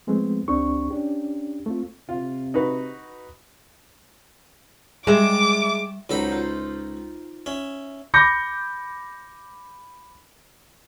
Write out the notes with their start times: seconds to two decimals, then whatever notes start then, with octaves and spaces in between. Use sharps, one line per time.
0.07 F3 G#3 A3 B3 C4
0.48 C#2 C4 D4 G4 C#6
0.91 C#4 D4 G4
1.66 A3 C4 F4
2.09 C3 F4
2.54 D#4 F#4 B4
5.07 G3 G#3 E5 D6
6.09 C#2 F#3 D#4 A4 C5 B5
6.31 F4
7.46 C#4 E5
8.14 B5 D6 G6 A#6 C#7